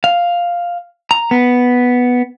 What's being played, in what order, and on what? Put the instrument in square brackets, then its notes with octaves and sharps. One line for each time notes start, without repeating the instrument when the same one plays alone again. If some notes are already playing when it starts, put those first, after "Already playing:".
[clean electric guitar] F5
A#5
B3